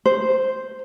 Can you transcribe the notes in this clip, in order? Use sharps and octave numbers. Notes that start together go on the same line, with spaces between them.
C5